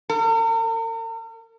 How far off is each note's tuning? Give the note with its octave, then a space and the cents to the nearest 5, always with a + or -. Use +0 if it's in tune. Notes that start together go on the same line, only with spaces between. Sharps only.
A#4 -45